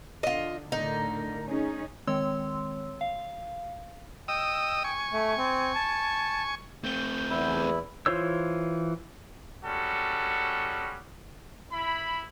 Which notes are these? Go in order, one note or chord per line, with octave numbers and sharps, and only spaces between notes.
D3 F4 D#5
A2 D3 D#4 A#4
C#4 D#4 G#4
D#3 G#3 C4 C#5 C6 E6
F5
D#5 G5 D#6 E6
G#5 C#6
A3
C4
A5
A3 C4 G6
E2 E4
E3 F4 C5 C#5 E6
G3 G#3 C#4 F#4 A4
E4 B5